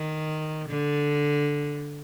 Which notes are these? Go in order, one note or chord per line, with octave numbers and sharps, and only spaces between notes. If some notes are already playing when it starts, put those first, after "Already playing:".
Already playing: D#3
D3